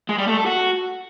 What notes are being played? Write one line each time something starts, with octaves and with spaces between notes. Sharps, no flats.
G#3
G3
A3
A4
F#4